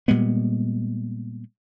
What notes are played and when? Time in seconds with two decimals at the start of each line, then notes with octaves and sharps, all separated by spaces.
0.08 A#2 G3 G#3 B3